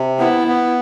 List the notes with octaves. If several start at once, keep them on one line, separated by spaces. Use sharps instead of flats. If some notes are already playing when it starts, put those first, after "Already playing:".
Already playing: C3
B3 E4
B3